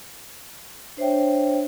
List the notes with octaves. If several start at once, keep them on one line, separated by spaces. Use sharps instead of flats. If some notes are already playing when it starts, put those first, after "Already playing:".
D4 C5 C#5 E5 G5